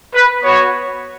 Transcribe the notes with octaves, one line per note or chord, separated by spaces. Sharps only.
B4
B3 F#4 C#5